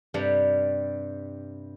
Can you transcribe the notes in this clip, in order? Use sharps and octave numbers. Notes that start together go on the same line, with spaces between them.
G2 C3 G3